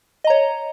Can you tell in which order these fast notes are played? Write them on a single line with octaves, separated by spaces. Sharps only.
D#5 A#5 C#5